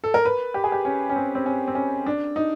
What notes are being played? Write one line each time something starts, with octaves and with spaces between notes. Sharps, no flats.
A4
A#4
B4
G4
G#4
G4
C#4
C#4
C4
C4
C#4
C4
C#4
D4
D#4